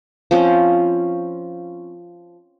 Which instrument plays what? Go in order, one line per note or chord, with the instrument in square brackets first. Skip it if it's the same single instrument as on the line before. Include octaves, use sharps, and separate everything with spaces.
[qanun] F3 C4 C#4